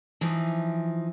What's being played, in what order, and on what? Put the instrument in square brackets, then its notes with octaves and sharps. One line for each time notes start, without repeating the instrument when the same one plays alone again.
[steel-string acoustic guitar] E3 F3 D#4